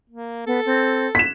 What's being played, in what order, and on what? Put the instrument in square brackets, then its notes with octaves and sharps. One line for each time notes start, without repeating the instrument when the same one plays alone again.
[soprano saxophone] A#3
[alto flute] B3 [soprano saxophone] A4
[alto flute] C4
[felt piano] B6 E7